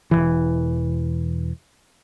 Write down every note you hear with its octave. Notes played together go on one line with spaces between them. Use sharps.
E1 C#2 E3